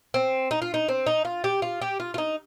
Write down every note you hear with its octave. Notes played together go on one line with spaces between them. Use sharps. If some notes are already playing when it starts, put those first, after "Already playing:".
C4
D#4
F4
D#4
C4
D#4
F4
G4
F4
G4
F4
F4
D#4